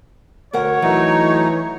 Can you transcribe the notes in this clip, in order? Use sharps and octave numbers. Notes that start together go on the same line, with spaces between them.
D2 A#4 C#5 F#5
E3 F#3 A3 D#4